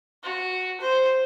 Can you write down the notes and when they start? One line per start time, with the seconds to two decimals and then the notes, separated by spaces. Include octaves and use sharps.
0.23 F#4
0.81 C5